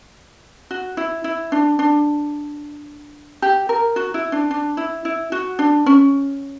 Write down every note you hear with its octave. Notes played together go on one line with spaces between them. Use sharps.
F#4
E4
E4
D4
D4
G4
A#4
F#4
E4
D4
D4
E4
E4
F#4
D4
C#4